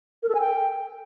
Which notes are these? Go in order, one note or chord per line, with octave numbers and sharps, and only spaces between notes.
A#4
A4
G#5
G5